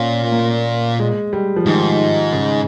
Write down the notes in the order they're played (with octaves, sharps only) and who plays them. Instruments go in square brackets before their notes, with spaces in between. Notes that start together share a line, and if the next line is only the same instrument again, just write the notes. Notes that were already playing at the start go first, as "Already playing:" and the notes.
Already playing: [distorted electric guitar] A#2 [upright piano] C#4
[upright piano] A#3
G#3
G3
F3
[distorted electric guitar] G#2 [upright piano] D#3
[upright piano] C#3